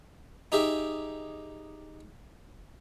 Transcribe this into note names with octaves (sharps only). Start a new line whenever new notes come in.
D#4 G4 G#4 E5